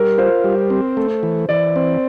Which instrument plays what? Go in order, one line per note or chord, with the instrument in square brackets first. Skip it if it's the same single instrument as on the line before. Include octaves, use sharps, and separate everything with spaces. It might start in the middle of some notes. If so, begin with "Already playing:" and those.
Already playing: [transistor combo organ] G3 [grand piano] A#4
[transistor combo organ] F4 [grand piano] C5
[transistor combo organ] G3
C4
A3
E3
[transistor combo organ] E3 [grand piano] D5
[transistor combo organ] C4